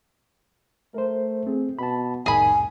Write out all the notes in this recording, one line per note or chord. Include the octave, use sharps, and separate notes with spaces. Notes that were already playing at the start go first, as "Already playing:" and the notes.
A3 A#4 C5
C4 G#4
B2 A5 B5
C2 F2 A2 D#3 G#4 G#5 B5